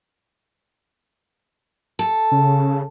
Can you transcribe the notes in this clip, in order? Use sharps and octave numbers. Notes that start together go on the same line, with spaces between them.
A4
C#3